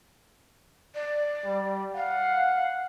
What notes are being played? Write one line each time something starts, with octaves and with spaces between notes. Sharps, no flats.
D5
G3
F5 F#5